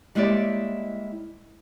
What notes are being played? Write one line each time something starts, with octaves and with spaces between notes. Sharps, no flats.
G3 G#3 A#3 E4 C#5 D5